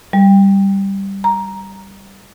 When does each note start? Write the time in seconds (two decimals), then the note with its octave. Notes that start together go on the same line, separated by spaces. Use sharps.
0.13 G3
1.24 A#5